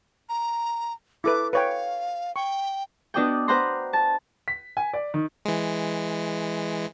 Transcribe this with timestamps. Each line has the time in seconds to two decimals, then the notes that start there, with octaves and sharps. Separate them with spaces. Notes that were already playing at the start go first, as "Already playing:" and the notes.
0.29 A#5
1.24 E4 A4 B4 D6
1.53 B4 C#5 F5 G5
2.36 G5 C#6
3.14 B3 D4 F#4 D5 D#5 G5
3.48 B4 C5 F#5 G5 A#5 C6
3.93 A5
4.48 B6
4.77 G#5
4.93 D5
5.14 D#3
5.45 E3 G#3